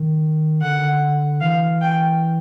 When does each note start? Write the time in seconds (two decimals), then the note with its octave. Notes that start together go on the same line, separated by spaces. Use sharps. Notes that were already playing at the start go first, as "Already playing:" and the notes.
Already playing: D#3
0.62 D3 F#5
1.41 E3 F5
1.81 G5